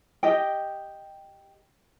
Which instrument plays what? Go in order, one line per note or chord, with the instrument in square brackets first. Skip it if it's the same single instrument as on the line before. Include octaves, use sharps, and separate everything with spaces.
[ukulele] G4 D#5 G5